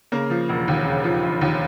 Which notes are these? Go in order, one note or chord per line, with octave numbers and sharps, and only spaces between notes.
C#3 A#3 A#4
F3
E1
D#2
C#3
F3
E1
D#2